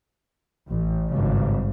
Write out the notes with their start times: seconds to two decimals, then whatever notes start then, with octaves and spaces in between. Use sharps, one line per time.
0.67 A1
1.10 G#1 G2 C#3